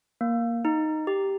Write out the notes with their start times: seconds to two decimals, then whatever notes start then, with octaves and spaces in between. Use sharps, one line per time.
0.21 A#3
0.65 D#4
1.07 G4